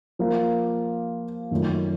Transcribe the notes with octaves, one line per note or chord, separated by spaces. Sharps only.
F3 A#3 F4
F#2 D#3 A3 C#4 F4